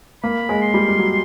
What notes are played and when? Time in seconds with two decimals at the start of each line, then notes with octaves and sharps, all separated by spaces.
0.23 A#3 B5
0.49 G#3
0.61 C6
0.74 G3
0.88 G3
0.98 F#3